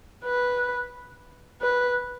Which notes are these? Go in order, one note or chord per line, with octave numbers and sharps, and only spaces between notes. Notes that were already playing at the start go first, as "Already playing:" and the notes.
B4
B4